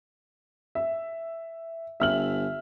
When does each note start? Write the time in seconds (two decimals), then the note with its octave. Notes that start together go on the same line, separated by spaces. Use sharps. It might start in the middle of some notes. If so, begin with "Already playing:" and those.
0.75 E5
2.00 G1 E5 F6 F#7